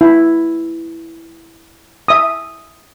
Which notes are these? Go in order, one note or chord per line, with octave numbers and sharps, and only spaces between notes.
E4
E5 D#6